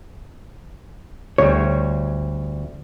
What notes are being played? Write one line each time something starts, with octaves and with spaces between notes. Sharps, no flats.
D2 G3 C#5